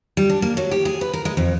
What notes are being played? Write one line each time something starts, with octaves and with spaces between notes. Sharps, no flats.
G3
D4
A#3
F#3
G4
G#4
B4
A#4
G#3
F2